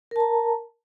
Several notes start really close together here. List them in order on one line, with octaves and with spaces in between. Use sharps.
A#4 A5 A#5